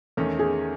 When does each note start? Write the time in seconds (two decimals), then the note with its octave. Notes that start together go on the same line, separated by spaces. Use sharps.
0.17 E2 D#3 A3 C#4
0.39 G#4